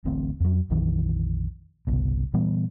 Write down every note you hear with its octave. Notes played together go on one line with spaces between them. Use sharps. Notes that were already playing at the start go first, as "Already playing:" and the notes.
D1 A1 D2 C4
F2 F#3
A#1 F2 D#3 E3
G1 C2 B2
A#2 E3 G3 B3